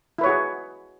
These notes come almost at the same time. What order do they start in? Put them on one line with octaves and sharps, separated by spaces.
E4 B4 C#5 F#4 G#4